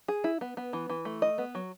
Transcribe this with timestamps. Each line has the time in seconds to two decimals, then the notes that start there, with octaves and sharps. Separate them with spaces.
0.08 G#4
0.24 E4
0.41 B3
0.57 B3
0.73 E3
0.90 E3
1.05 A3
1.22 D#5
1.38 B3
1.55 F#3